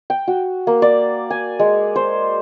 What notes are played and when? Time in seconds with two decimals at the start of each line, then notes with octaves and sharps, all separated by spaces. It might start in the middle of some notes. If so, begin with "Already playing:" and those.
0.10 G5
0.28 F#4
0.67 A#3
0.82 D5
1.30 G#5
1.59 G#3
1.96 C5